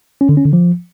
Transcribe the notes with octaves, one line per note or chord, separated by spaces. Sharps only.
C#4
D3
C#4
D3
F3